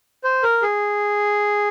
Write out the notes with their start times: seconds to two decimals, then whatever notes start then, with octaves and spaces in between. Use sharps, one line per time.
0.24 C5
0.43 A#4
0.62 G#4